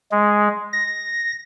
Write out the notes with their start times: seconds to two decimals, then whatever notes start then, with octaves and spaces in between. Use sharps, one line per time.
0.12 G#3
0.73 A#6